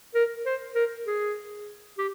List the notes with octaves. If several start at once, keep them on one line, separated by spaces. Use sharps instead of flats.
A#4
C5
A#4
G#4
G4